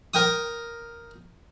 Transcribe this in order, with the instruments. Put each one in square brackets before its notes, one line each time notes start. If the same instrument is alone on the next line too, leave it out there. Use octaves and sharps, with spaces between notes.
[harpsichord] A#4 G5 D#6